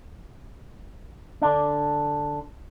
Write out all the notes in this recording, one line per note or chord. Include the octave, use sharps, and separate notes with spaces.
D3 D4